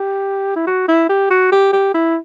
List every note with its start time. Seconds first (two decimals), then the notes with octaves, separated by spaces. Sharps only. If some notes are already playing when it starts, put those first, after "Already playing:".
Already playing: G4
0.56 E4
0.67 F#4
0.88 E4
1.09 G4
1.30 F#4
1.52 G4
1.73 G4
1.94 E4